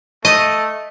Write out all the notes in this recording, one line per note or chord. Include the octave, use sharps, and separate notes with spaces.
A3 D#5